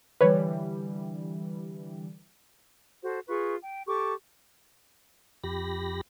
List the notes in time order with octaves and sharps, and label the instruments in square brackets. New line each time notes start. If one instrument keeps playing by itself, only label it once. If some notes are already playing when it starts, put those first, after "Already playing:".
[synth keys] D3 E3 G3 [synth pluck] B4 C#5
[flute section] F#4 A4 C5
F4 G#4 B4 C#6
G5
G4 A4 C#6 D6
[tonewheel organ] F2 G4 B5 A#6